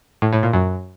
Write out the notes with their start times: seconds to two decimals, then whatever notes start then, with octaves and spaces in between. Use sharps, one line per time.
0.22 A2
0.33 A2
0.43 A#2
0.53 F#2